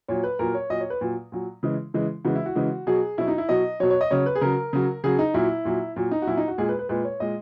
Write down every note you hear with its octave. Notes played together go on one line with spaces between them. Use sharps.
A#2 F#3 C#5
B4
A#2 F#3 A#4
C#5
A#2 F#3 D#5
C#5
B4
A#2 F#3
A#2 F#3
C#3 E3 G#3
C#3 E3 G#3
C#3 E3 G#3 F#4
E4
F#4
C#3 E3 G#3
B2 F#3 G#4
B2 F#3 E4
D#4
E4
B2 F#3 D#5
B2 F#3 C#5
C#5
D#5
C#3 F#3 C#5
B4
G#4
C#3 F#3 A#4
C#3 F#3
C#3 F#3 G#4
D#4
A#2 F#3 E4
A#2 F#3
A#2 F#3
D#4
F#4
A#2 F#3 E4
D#4
F#4
A#2 G#3 G#4
B4
B4
A#2 G#3 B4
C#5
A#2 G#3 D#5